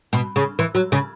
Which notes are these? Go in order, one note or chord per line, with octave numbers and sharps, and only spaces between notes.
B2
C#3
E3
F#3
C#3